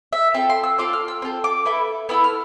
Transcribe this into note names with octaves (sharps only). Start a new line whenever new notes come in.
E5
C4 F4 A4 E5
C6
E6
C4 F4 A4 D6
F6
E6
C4 F4 A4
D6
B3 E4 A4
B3 E4 A4 E6
F6